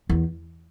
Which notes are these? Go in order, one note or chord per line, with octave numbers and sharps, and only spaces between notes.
E2